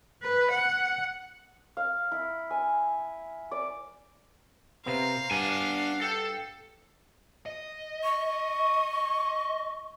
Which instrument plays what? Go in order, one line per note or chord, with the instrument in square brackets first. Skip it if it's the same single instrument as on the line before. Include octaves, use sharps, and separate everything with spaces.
[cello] B4
F#5
[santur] F5
E4
G#5
D5
[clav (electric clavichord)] C3 B3 [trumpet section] A#4 C5 A#5 [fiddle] F5
[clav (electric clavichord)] G2 [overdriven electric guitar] D4 G#5 [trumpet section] F#5
[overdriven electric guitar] A4 [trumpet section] G5
[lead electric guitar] D#5
[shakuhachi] C#6